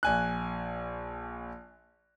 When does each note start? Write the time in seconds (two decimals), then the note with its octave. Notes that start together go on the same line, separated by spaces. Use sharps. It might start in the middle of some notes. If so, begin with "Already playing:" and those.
0.03 A#1 G#5 F#6